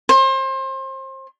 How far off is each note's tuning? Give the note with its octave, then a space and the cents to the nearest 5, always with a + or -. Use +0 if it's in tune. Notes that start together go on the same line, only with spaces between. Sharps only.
C5 +30